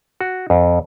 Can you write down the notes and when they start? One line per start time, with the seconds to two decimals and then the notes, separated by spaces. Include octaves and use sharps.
0.21 F#4
0.50 F2